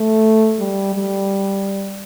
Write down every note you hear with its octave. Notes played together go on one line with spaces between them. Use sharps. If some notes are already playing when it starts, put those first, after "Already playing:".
Already playing: A3
G3
G3